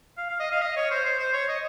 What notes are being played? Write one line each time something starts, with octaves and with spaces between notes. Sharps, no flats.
F5
F5
D#5
F5
D#5
C#5
C5
C5
C5
C#5
D#5